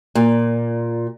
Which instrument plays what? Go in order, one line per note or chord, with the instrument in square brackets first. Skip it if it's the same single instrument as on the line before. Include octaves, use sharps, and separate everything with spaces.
[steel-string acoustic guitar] A#2